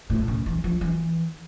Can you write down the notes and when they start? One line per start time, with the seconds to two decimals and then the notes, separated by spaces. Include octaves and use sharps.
0.10 A2
0.28 C#3
0.46 E3
0.64 F3
0.81 E3